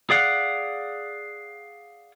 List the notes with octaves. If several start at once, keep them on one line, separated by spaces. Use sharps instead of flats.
G#4 D5 F5 F#5